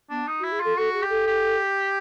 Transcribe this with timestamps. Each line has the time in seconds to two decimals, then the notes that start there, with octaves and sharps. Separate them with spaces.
0.10 B3 D4
0.27 D#4
0.40 F#4
0.44 E4
0.52 G#4
0.60 F4 A4
0.77 F#4 A4
0.93 G#4
1.02 G4
1.09 A4
1.27 G4